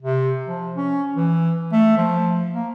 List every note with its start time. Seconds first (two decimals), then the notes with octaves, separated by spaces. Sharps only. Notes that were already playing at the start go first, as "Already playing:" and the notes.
0.02 C3
0.47 F3
0.77 C#4
1.16 E3
1.72 A3
1.97 F3
2.54 A#3